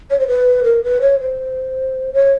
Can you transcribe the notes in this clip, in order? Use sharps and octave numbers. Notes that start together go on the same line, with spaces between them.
C#5
C5
B4
A#4
B4
C#5
C5
C#5